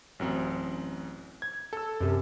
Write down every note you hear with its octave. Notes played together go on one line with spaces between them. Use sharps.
A1 F#2 C4
G#6
A4 E6
F#2 C3